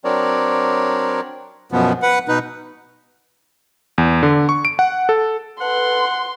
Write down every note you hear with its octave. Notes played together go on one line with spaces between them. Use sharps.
F#3 C4 D4 A#4 C#5 D5
F#2 B2 F3 B3
B4 F#5
B2 D#4 B4
E2
D3
C#6
D7
F#5
A4
A4 B4 F#5 C6